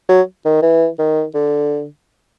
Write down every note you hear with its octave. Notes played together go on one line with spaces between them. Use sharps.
F#3
D#3
E3
D#3
D3